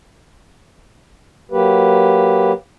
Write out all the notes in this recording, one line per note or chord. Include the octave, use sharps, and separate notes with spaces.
F#3 A#3 G4 B4